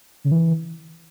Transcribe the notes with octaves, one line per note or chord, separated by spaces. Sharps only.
C#3
E3